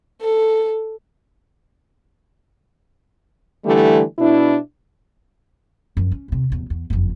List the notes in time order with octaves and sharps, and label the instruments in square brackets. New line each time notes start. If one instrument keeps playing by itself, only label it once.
[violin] A4
[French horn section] D3 E3 G3 A3
B2 D4 E4
[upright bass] F#2 F3
C#4
D#2 C3
D#1 E2
E2
F#1 F2